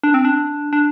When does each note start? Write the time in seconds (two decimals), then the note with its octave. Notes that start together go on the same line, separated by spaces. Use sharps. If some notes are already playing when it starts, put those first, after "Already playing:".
0.03 D4
0.14 C4
0.25 D4
0.73 D4